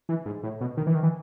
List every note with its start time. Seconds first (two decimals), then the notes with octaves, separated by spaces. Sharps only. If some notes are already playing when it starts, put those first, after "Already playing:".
0.09 E3
0.26 G#2
0.43 A2
0.61 B2
0.77 D#3
0.87 E3
0.95 D#3
1.03 E3